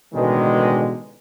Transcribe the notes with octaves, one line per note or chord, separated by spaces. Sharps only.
A1 B2 D3 D#3 G#3